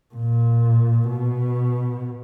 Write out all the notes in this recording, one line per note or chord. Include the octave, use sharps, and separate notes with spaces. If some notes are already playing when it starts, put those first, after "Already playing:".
A#2
B2